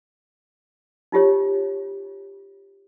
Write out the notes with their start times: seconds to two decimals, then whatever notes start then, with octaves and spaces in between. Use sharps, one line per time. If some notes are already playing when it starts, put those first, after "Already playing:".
1.12 D#4 F4 G4 C#5